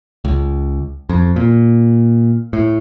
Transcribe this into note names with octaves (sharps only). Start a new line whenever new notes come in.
C#2
F2
A#2
A2